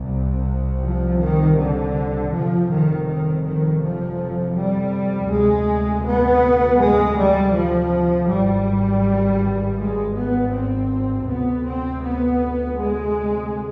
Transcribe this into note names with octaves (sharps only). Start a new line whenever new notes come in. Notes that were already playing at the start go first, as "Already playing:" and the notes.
Already playing: C2 C3
F3
D#3
D3
G1 F2 C3 F3
D#3
D#3
D#3
F3
G3
D2 C3 G#3
B3
G#3
G3
F3
G#1 G2 G3
G#3
B3
C4
D2 C3 B3
C4
B3
G#3